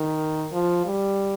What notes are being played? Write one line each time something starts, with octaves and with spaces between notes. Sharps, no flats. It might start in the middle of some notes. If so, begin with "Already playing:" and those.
Already playing: D#3
F3
G3